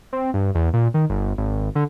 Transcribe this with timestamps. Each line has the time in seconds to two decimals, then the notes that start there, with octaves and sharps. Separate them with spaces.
0.13 C4
0.34 G2
0.55 E2
0.74 A#2
0.94 D#3
1.10 G1
1.38 G#1
1.75 D3